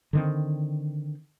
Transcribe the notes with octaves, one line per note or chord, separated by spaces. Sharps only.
D3 D#3 C4